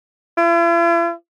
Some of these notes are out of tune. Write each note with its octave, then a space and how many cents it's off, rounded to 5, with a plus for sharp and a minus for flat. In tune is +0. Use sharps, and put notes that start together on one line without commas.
E4 +45